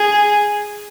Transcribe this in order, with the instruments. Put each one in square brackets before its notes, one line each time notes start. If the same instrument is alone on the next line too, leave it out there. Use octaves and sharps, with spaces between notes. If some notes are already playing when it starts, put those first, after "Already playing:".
Already playing: [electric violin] G#4